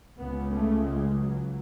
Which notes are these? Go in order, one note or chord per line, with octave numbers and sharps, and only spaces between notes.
C#2 C#3 B3
A3
G#3
F#3